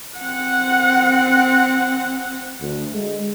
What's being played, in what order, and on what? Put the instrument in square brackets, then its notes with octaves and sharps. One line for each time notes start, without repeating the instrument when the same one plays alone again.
[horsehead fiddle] C4 F#5
[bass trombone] D2
G#3